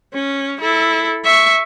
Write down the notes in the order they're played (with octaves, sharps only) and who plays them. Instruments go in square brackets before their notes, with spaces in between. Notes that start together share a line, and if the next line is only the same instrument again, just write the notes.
[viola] C#4
E4 A4
E5 C#6